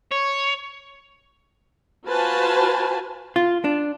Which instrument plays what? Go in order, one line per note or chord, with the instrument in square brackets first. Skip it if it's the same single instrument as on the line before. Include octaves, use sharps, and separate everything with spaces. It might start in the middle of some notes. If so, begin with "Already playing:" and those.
[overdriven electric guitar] C#5
[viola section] F4 F#4 B4 C5 G#5 A5
[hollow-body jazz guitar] F4
D4